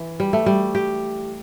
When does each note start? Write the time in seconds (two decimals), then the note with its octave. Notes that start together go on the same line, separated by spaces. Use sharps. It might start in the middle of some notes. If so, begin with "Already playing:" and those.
Already playing: E3
0.20 G3
0.33 A3
0.46 G3
0.75 G4